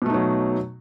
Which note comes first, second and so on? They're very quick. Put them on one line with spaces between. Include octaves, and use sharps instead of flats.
B2 A3 D#4 F#3